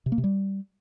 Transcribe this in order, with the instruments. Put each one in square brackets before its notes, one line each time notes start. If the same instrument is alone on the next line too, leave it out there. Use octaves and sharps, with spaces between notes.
[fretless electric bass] C3
A#3
C3
G3